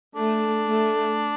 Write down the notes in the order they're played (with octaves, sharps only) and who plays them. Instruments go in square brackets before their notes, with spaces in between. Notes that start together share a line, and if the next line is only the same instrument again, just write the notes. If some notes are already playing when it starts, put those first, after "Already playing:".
[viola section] A3 [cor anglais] D4
[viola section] A3